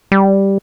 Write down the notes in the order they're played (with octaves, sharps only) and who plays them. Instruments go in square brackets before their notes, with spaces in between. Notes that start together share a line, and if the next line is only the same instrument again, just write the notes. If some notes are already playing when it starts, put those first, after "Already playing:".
[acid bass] G3